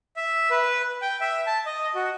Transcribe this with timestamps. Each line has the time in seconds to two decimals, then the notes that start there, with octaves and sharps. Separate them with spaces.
0.16 E5
0.51 B4
1.02 G5
1.21 E5
1.47 A5
1.66 D#5
1.95 F#4